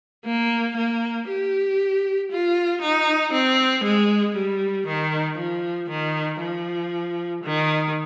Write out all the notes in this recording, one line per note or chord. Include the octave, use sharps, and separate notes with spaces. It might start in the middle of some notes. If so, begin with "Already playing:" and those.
A#3
A#3
G4
F4
D#4
C4
G#3
G3
D#3
F3
D#3
F3
D#3